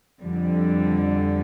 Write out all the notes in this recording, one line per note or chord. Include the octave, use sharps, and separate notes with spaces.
F2 D3 G3